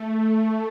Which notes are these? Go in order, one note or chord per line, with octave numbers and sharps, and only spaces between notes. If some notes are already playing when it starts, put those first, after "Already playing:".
Already playing: A3